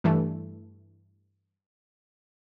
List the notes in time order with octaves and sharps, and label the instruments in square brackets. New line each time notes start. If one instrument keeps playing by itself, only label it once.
[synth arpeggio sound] G2 E3 A3